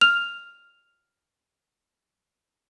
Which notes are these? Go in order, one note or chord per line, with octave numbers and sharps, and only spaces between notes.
F6 F7